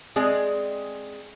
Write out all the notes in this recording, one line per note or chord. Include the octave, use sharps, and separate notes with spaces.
G#3 C4 G#4 D5 G#5